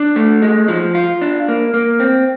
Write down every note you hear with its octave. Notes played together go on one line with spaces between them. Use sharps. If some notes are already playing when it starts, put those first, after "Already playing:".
Already playing: D4
A3
G#3
F3
F4
D4
A#3
A#3
C4